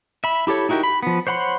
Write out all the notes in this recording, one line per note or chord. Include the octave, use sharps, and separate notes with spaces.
E5 B5
E4 G4 A4 C#5
D#4 E4 F#4 G4 A#4
B5
F3 B3
C5 C#5 F#5 B5 C6